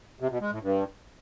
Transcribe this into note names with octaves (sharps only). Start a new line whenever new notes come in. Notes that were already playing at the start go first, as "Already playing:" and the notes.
C3
B2
G#3
A2
G2